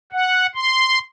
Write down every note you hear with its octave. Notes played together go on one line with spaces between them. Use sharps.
F#5
C6